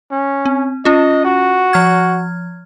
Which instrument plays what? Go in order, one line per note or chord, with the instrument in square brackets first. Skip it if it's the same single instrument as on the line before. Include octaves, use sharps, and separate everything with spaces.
[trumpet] C#4
[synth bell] C4
[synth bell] C#4 F4 [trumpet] D#5
[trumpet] F#4
[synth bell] F3 F6 G#6